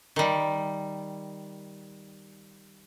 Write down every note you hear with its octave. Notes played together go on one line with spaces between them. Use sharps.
D#3 G3